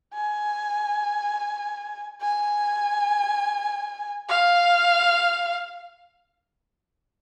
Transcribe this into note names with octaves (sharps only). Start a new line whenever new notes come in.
G#5
G#5
F5